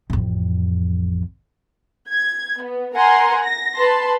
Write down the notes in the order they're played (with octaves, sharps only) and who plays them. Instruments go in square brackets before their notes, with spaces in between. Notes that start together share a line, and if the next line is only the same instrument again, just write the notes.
[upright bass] A1 F2
[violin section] G#6
B3
A#4 F#5 G#5 A#5 C6
A#6
B4 A5 B5 C6